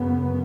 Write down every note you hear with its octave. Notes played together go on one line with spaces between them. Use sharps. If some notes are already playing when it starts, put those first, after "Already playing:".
Already playing: F#2 C#3 B3